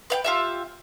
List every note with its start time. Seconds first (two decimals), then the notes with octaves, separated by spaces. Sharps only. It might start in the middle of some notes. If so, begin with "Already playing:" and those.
0.10 B4 F5 G5
0.24 F4 G4 E5